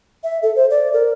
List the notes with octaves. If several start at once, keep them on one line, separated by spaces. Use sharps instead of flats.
E5
A4
C5
D5
A#4